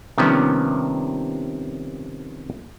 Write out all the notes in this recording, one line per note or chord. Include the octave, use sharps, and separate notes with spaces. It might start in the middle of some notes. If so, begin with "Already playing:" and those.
C3 D#3 F3 G3 B3 C#4